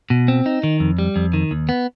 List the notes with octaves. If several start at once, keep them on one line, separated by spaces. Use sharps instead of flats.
B2
C4
D#4
D#3
F2
G3
F2
D#3
D#2
B3